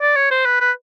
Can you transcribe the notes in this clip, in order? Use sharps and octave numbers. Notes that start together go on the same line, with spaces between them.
D5
C#5
C5
B4
B4